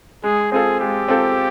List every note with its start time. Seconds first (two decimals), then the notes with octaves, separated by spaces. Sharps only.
0.24 G#3 G#4
0.52 C4 F4 G#4 A4
0.81 G#3 G4
1.08 C4 F4 A4